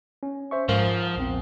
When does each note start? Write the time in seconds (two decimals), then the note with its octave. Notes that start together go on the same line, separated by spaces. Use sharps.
0.23 C#4
0.51 C5 E5 C#6
0.69 G#2 F3 A#4 C5 F5
1.16 A#1 E2 C4